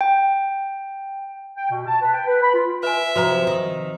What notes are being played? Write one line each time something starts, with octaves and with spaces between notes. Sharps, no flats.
G5
G5
B2
A5
B4
G5
B4
B5
F4
B4 E5 G#5
C3 F3 F#4 B4 A#5
D#3